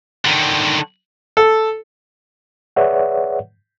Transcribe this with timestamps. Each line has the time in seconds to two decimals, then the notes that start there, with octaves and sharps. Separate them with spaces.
0.25 D3 D#3
1.37 A4
2.76 G#4 B4 C#5 D5 E5 F#5